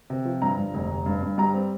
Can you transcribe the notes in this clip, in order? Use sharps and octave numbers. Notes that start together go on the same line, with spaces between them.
C3
F3
G2 A#5
G2
F1
F1
G2
G2
G3 A#5
C4